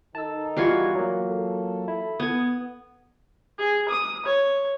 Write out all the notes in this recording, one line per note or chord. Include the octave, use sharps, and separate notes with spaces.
D#3 D#4 A4 A5 E6
E3 G3 F4 F#4 F5 G#6
F#3 A#3
A4
E4
B3 D#6 G#6
G#4
D#6
C#5